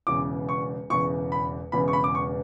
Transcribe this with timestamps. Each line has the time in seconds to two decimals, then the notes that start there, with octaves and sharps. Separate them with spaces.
0.07 E1 E2 C#3 E3 D6
0.49 C#6
0.90 E1 E2 C#3 E3 C#6
1.32 B5
1.72 E1 E2 C#3 E3 B5
1.88 C#6
1.93 B5
2.04 D6
2.15 C#6